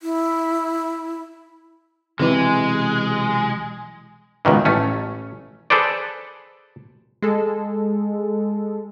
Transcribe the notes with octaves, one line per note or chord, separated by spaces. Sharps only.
E4
B1 C3 E3 G#3
C#2 B2 D#3 E3
A1 A3 C#4
G#4 A4 B4 C5 D5
G#3 A4